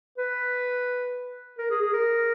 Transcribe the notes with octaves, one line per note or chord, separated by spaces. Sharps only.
B4
A#4
G#4
G#4
A#4